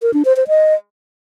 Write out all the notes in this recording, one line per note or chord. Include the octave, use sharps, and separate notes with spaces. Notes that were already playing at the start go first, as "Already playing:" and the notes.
A#4
D4
C5
C5
D#5